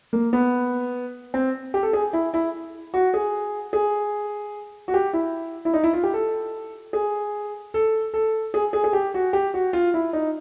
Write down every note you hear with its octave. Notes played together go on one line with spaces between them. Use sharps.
A#3
B3
C4
G4
A4
G#4
E4
E4
F#4
G#4
G#4
F#4
G4
E4
E4
D#4
E4
F4
G4
A4
G#4
A4
A4
G#4
G#4
G#4
G4
F#4
G4
F#4
F4
E4
D#4